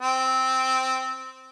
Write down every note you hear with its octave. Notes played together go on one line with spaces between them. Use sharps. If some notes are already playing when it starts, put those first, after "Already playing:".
C4